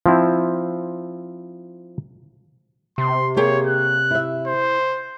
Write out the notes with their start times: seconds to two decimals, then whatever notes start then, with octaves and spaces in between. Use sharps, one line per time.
0.06 F3 C4 E4
2.98 C3 C6
3.36 A#3 G4 G#4 C#5
3.67 F#6
4.11 E4 E5
4.47 C5